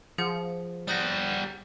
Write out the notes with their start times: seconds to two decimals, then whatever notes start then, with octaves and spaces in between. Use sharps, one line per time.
0.18 F3 G#4 F#5
0.88 G3 F#5 D#6 G6 A#6